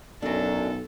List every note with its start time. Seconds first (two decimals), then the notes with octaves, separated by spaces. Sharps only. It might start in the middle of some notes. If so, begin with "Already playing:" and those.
0.22 B1 F#2 F#3 D4 A4